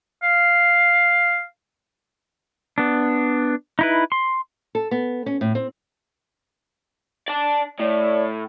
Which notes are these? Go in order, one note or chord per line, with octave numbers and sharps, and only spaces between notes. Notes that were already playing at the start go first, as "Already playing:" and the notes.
F5
B3 D4
D#4 E4 B4
C6
A4
B3
C#4
A2
C4
D5 A5
A2 C#5 D5